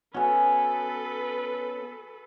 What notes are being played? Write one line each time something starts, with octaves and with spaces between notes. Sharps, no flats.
B3 C#4 F#4 A4 B4 G#5